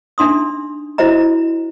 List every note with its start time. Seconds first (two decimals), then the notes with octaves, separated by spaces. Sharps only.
0.18 D4 D#4 C6 D#6
0.98 E4 F#4 C5 D#5 A#5